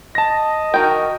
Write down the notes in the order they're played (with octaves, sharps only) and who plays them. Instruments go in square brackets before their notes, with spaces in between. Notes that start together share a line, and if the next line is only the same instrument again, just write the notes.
[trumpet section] D#5 [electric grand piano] A5 A#6
[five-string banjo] D#3 G5 [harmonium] F#4 A#4